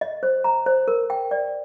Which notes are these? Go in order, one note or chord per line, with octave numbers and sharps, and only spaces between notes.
D#5
C5
A#5
C5
A#4
G5
D5